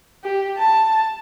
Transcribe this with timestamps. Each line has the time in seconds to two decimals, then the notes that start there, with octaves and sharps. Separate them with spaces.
0.24 G4
0.58 A5